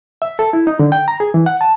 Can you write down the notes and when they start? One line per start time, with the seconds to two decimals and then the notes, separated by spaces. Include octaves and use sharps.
0.22 E5
0.39 A4
0.53 E4
0.67 D#4
0.79 D3
0.92 G5
1.08 A#5
1.20 G#4
1.34 E3
1.46 F#5
1.61 A5